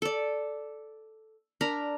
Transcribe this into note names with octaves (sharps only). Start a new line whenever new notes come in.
A4 D5
D4 A#4 A#5 B5